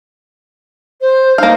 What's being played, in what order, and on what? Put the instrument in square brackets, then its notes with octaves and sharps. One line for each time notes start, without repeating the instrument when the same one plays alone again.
[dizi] C5
[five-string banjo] A#3 F5 [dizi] D#4